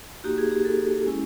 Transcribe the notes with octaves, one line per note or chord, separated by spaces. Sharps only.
A#3 D#4 F#4 G4
G#4
G4
A4
G#3 C#4 E4